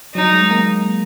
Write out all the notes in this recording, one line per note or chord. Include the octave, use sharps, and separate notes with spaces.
F#3 D#4
G#3
A#3